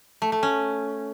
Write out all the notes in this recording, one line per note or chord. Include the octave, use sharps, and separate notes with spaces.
A3
A3
C#4